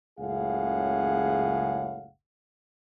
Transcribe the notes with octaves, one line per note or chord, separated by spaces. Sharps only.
F#1 C#2 A2 G#4 F5 F#5